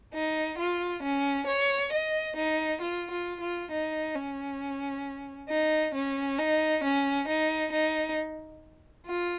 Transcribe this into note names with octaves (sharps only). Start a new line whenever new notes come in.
D#4
F4
C#4
C#5
D#5
D#4
F4
F4
F4
D#4
C#4
D#4
C#4
D#4
C#4
D#4
D#4
F4